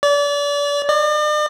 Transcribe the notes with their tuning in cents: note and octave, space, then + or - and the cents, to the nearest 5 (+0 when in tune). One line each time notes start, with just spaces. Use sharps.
D5 -35
D5 +45